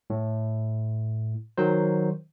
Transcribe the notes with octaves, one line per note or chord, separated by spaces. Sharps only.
A2
D#3 F#3 C5